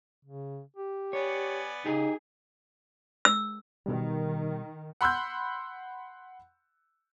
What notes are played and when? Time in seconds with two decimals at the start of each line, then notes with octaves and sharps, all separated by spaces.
0.25 C#3
0.76 G4
1.13 B3 C#5 D5 G#5
1.86 C#3 D#4 G4 G#4
3.25 E6
3.86 B2 D#3 G3
5.01 F#5 B5 C6 E6 F#6 G6